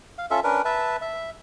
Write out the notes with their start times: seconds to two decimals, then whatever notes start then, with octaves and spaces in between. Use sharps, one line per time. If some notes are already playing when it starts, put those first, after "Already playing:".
0.18 F5
0.31 C#4 F4 A4 E5
0.44 C#4 D4 A#4 B4
0.65 B4 E5 A5
1.01 E5